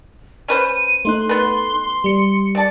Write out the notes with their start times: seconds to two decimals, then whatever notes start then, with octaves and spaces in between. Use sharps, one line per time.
0.48 C#4 B4 C5 D#7
1.05 A3 D#4 C6 F#6
1.29 B3 B4
2.04 G3 C#7
2.55 D5 A5